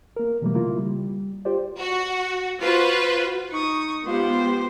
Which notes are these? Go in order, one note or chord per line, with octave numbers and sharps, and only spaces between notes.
A#3 A#4
B2 E3 F#3 G3 A3 A#3
C#3 A#3 E4 F4
G3
F4 G4 C5 D5
F#4
F4 F#4 B4 C5
D#4 C#6 D#6
G#3 B3 F4 G4 C5